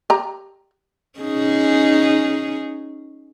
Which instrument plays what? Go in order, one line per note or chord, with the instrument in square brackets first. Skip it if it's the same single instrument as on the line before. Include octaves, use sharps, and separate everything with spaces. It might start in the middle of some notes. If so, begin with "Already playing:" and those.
[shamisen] G4 A#5
[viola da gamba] C#4 D#4 G#4